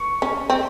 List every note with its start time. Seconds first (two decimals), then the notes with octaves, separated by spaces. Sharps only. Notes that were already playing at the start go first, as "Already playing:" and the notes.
Already playing: C#6
0.22 C#4
0.50 C4